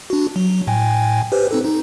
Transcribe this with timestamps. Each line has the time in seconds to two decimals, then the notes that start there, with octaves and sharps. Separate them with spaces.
0.10 D4 F#4
0.36 F#3
0.67 A2 G5 G#5
1.32 G4 B4 C5
1.51 C4 D#4 A4
1.64 D#4